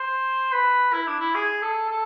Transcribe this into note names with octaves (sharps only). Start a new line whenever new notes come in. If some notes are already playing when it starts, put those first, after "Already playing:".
Already playing: C5
B4
E4
D4
E4
G#4
A4
A4